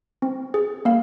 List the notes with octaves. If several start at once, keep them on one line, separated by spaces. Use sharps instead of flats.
C4
G#4
A#3 F5